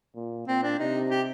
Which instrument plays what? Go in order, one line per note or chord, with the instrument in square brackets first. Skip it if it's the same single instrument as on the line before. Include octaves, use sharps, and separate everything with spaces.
[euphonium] A#2
[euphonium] A#2 [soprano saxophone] C4
[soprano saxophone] D4
[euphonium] C3 [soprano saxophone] D#4
[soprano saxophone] G4